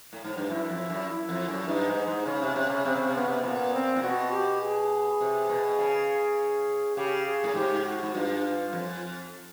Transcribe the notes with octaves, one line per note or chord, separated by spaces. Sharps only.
A2
G#2
G2
F#2 E4
F#2
F2
F#2
E4
F2
F#2
G2 D#4
G#2
G#2
C#3 C#4
C3
C3
C#3
C3 C4
C#3
C3
C#3 B3
C3
A#2 B3
C4
A#2
B2 F#4
G4
G#4
C3
B2
C#3
C#3 G4
G#4
A2
G#2 G4
F#4
G#2
G2 F4
F2